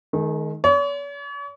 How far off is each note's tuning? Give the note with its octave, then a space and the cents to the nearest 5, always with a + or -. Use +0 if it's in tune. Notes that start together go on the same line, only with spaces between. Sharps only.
D#3 +0 G#3 +45
C#5 +45 C6 -30